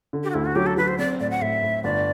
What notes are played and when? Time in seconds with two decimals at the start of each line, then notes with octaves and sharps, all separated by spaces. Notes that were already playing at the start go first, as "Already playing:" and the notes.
0.13 D3
0.24 G4
0.30 F#4
0.34 D2 E4
0.45 F#4
0.56 F#3 G4
0.66 A4
0.77 F#3 B4
0.88 C5
0.98 C4 D5
1.20 A2 D5
1.31 F#5
1.41 A2 E5
1.63 A2
1.84 G1 D5